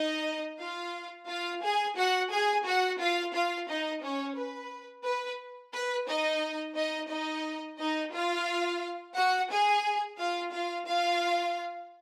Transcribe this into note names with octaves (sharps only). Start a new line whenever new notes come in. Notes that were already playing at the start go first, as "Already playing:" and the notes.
Already playing: D#4 D#5
F4 F5
F4 F5
G#4 G#5
F#4 F#5
G#4 G#5
F#4 F#5
F4 F5
F4 F5
D#4 D#5
C#4 C#5
B4
B4
B4
D#4 D#5
D#4 D#5
D#4 D#5
D#4 D#5
F4 F5
F#4 F#5
G#4 G#5
F4 F5
F4 F5
F4 F5